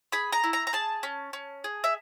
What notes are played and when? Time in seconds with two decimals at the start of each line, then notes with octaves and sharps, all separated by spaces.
0.12 G#4 B5
0.32 A#5
0.44 E4
0.53 A#5
0.67 A#5
0.73 G#4 A5
1.03 C#4
1.33 C#4
1.64 G#4
1.84 E5